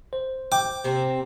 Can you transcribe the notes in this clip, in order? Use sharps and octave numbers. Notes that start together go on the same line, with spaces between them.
C5
G5 D6
C3 C4 A#4